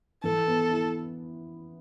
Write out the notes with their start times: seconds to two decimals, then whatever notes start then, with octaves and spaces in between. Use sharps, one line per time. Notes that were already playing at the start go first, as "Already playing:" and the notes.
0.23 E3 A4
0.47 B3
0.71 E4